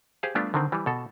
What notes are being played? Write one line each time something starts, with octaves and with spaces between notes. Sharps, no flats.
G4 G#4 C5 F5
G3 A3 B3 D4 F4 G4
D3 D#3 C4
E3 G3
B2 A4